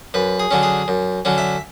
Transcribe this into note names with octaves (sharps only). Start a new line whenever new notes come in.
F#2 B4
G#4
D3 F#3 C#4
G#4
F#2
D3 F#3 C#4
E5